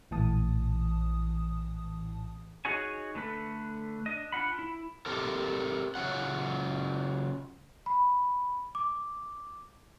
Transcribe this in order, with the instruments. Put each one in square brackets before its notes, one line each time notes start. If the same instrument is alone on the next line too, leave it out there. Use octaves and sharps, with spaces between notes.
[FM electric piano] A#1 A2 E3 A5 D#6
[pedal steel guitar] D#4 F#4 G#4 C#5 G#5
D3 A3 B4
D4 D#5
D4 F4 F#5 B5
E4
[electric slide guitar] C4 G4 A4 A#4
C#3 F#3 C#4 F4 F#5
[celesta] B5
D6